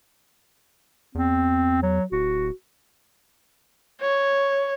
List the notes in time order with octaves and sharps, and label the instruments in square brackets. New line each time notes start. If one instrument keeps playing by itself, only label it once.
[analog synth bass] E2 [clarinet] C4
[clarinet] F#3
[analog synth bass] D1 [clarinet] F#4
[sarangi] C#5